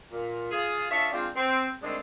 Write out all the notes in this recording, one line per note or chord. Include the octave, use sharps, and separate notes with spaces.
A#2
F4 G#4
D4 F4 A4 C#5 D#5 E5
G#3 C4 D4 F4
C4
D3 D#3 G#3 A3 C4 D4